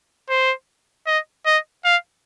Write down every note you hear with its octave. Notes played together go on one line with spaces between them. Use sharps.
C5
D#5
D#5
F5